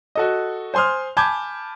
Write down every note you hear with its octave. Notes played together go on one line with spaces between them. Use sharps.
F#4 A4 D#5
C5 G#5 C6 D#6 F6
G#5 A5 B5 D6 G6 G#6